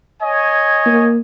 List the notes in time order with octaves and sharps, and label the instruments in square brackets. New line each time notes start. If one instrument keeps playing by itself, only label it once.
[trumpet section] C#5 D#5 G#5
[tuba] A#3